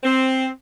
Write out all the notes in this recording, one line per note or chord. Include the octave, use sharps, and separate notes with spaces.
C4